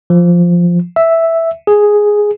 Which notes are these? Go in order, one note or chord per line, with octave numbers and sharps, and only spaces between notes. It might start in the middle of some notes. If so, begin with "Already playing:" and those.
F3
E5
G#4